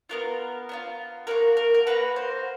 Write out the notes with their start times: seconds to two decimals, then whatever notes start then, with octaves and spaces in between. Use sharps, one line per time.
0.09 B3 D4 F4 A#4
0.69 B3 D4 F4
1.27 A#3 C#4 F#4 A#4
1.57 A#4
1.75 A#4
1.87 A#3 C#4 F#4 B4
2.16 C5